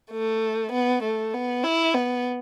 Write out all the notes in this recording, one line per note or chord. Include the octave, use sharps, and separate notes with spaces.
A3
B3
A3
B3
E4
B3